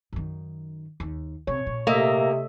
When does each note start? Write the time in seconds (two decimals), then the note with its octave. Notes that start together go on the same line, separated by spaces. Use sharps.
0.13 F#2 D#3
1.00 D#2
1.47 C3 C#5
1.66 A#2
1.87 C3 A3 A#3 D#5 E5